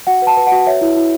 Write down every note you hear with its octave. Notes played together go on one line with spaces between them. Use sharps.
F#4 F#5
B4 A5
B4
F#5
F#4
C#5 E5
E4
E4